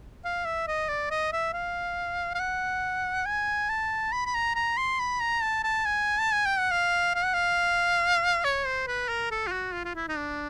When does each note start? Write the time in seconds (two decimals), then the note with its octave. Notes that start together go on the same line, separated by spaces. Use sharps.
0.25 F5
0.45 E5
0.68 D#5
0.89 D5
1.11 D#5
1.32 E5
1.53 F5
2.35 F5
2.39 F#5
3.26 G#5
3.69 A5
4.12 B5
4.26 B5
4.34 A#5
4.55 A#5
4.77 C6
4.99 B5
5.20 A#5
5.42 A5
5.64 A5
5.85 G#5
6.19 A5
6.32 G#5
6.46 G5
6.59 F#5
6.71 F5
7.15 F5
7.24 F#5
7.34 F5
8.44 C#5
8.66 C5
8.87 B4
9.08 A#4
9.31 A4
9.47 F4
9.52 F#4
9.73 F4
9.85 F4
9.95 E4
10.08 D#4
10.17 D4